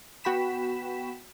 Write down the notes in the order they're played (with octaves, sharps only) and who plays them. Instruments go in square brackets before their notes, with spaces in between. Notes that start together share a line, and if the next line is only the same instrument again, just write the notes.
[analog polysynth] B3 F#4 G5 B5 B6 E7